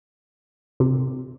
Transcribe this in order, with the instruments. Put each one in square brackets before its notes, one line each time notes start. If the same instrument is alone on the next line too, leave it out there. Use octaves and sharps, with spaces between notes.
[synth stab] C3